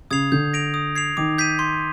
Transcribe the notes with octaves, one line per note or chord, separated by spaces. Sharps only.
C#3 D#6 G#6 C7 F7
D3 G6
A#6 D7 F7
D#6
G#6 C7 F7
D#3 D6
G6 B6 D#7
C6